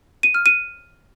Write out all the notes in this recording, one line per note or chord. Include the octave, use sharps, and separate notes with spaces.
D#7
F6
D#7